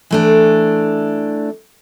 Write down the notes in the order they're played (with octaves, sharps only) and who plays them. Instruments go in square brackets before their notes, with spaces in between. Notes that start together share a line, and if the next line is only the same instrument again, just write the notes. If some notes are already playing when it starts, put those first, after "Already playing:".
[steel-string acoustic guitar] E3 A3 D4